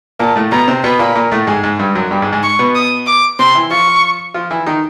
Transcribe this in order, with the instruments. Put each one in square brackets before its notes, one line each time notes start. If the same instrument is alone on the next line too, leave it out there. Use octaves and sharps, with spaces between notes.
[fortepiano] A#2 A#3 [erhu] A5
[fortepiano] A2 A3
[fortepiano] B2 B3 [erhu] A#5
[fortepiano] C3 C4
[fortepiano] B2 B3 [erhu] B5
[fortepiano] A#2 A#3
A#2 A#3
A2 A3
G#2 G#3
G#2 G#3
G2 G3
F#2 F#3
G2 G3
G#2 G#3
G#2 G#3
[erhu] C#6
[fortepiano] B2 B3
[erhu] D#6
D6
[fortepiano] C3 C4 [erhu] C6
[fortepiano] E3 E4
[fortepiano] F3 F4 [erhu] C#6
[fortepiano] F3 F4
E3 E4
D#3 D#4